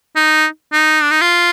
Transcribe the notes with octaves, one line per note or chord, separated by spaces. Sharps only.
D#4
D#4
D4
D#4
F4